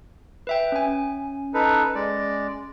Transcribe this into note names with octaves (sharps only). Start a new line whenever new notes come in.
B4 E5 G5
C#4 G#5
D#4 A4 B4
G#3 D5